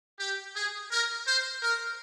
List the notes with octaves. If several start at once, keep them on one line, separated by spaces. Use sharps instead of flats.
G4
G#4
A#4
C5
A#4